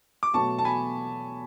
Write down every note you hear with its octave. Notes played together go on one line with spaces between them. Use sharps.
D6
B2 F#3 A3 A5 C#6
A5
G#5 B5